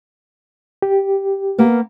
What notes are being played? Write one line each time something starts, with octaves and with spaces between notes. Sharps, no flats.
G4
A#3 B3 F5